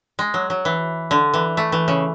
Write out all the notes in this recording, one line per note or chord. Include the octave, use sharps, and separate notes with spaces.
G#3
F#3
F#3
E3
D3
E3
A3
E3
C#3